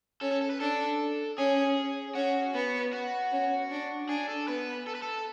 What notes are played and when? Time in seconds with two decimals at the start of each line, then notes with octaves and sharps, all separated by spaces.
0.21 C#4 A4
0.31 A4
0.41 A4
0.50 B4
0.60 D4 A4
1.38 C#4 G#4
2.15 C#4 F#4
2.54 B3
2.93 F#4
3.32 C#4
3.71 D4
4.09 D4 G#4
4.29 A4
4.48 B3 B4
4.87 A4
4.95 B4
5.02 A4